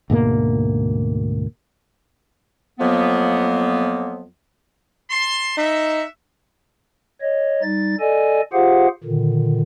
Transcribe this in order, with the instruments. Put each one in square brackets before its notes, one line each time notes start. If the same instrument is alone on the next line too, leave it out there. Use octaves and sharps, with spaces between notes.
[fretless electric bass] D2 G#2 B2 A#3
[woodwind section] F2 F3 F#3 A#3 B3
[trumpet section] A5 C6
[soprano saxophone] D#4 [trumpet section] F#4 E5
[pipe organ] C#5 D#5
G3 D#4 A6
A4 D5 D#5 G#5
F4 G4 G#4 C5 F5 F#5
A#2 D3 D#3